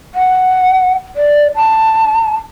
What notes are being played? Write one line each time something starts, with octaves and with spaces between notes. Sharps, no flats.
F#5
D5
A5